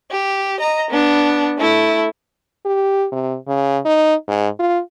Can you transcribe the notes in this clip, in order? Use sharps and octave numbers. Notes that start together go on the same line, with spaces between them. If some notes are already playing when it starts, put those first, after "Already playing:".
G4
D#5 A#5
B3 D4
A3 E4
G4
C3
C#3
D#4
G#2
F4